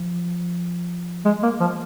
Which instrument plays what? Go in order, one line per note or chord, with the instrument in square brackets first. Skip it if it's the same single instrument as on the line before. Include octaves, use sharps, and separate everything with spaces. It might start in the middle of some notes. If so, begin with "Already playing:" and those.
Already playing: [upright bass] F3
[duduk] G#3
A#3
F3